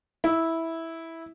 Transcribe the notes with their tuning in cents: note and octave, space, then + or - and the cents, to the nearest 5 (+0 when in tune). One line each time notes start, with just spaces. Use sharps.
E4 -10